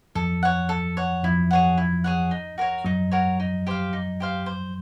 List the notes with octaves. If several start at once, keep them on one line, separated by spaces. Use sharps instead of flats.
F2 F3 A4
C#5 F#5
A4
C#5 F#5
F2 F3 E4
G#4 C#5 F#5
E4
G#4 C#5 F#5
D#4
F#4 A#4 C#5
F#2 F#3 D#4
F#4 A#4 C#5
D#4
G4 C5 F5
D#4
G4 C5 F5
C5